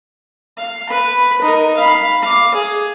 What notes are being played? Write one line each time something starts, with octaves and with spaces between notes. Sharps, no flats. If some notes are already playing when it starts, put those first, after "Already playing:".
F5
B4 B5
D#4 A#4
F5 B5
F5 D6
G#4